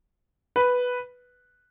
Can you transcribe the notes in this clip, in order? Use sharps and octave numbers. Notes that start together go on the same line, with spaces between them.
B4